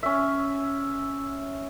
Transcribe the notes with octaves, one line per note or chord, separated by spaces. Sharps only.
C#4 E5